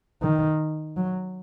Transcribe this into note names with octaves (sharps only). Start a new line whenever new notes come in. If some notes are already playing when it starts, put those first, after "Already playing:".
D#3
F#3